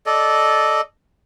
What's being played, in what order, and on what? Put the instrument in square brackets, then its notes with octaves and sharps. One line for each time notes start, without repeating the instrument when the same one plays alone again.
[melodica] A4 D5 D#5